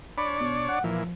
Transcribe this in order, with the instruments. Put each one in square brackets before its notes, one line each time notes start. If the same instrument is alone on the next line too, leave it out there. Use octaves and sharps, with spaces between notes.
[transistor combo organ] D4 C#5 D5 [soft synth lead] B5
[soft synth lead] B2
F#5
[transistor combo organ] A#2 E3 [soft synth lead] F3